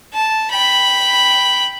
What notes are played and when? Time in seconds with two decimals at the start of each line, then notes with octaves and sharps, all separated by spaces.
0.13 A5
0.51 G5 B5